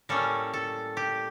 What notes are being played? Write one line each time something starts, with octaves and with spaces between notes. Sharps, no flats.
A2 G3 A#3 C#4 A4
A4
G4